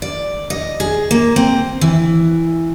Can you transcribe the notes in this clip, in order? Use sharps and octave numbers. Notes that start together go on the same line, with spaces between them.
D5
D#5
G#4
A#3
C4
E3